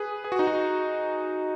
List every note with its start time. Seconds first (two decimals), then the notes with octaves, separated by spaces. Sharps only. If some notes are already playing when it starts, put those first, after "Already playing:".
Already playing: G#4 B4
0.24 G#4
0.32 F#4
0.39 D#4
0.47 F#4